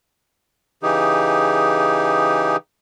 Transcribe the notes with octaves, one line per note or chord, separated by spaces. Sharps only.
C#3 E3 D#4 G4 G#4